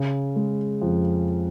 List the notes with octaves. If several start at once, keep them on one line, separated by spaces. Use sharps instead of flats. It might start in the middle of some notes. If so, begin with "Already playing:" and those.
Already playing: C#3
G#3
F2